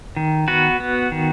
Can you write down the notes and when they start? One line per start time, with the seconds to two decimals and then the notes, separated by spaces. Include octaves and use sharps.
0.16 D#3
0.48 B3 F#4 B4
0.80 B3
1.12 D#3